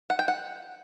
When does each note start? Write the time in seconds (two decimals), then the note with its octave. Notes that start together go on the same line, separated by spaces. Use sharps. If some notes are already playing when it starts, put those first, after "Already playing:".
0.10 F#5
0.19 G5
0.28 F#5